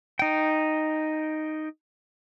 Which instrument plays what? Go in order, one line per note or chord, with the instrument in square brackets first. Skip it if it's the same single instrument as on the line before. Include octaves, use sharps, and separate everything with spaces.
[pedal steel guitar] D#4 G5